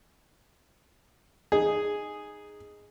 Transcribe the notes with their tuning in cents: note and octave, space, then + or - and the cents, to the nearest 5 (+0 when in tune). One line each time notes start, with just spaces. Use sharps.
D#4 -10 G#4 +0